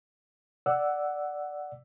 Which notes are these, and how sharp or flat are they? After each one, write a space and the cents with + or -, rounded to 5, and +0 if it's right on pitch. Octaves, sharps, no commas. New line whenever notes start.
D5 +0 F#5 +5 E6 +0